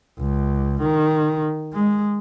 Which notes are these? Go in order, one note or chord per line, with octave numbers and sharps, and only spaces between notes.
C#2
D#3
G#3